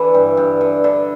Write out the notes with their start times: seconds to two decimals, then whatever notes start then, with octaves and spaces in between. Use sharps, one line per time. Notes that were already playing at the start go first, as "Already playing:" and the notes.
Already playing: D3 E3 E4
0.14 G2
0.37 G2
0.61 D3
0.84 D3